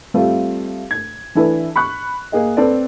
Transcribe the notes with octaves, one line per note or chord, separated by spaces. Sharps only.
G3 A3 C4 F4
G#6
E3 D4 E4 A4 B4
B5 C#6 F#6
A#3 G#4 D#5
C4 A4 B4 D5